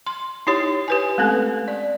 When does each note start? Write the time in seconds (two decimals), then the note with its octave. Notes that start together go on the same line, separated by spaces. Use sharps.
0.07 C6
0.47 D#4 E4 G4 C#5
0.88 G4 B4 G#5
1.18 G#3 A3 C4 C#4 A4
1.68 D5